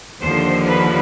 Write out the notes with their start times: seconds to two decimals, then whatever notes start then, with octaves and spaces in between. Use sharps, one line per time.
0.21 D#2 D3 F3 C5
0.66 B4